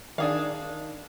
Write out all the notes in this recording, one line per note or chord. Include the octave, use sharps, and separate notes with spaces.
D#3 D4 G#4 F5